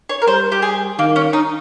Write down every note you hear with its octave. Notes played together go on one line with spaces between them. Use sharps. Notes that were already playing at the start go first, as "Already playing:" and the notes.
C#5
A#4
G3 C5
G4
G#4
D#3 A#3
C#4
D#4